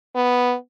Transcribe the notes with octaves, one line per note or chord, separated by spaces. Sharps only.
B3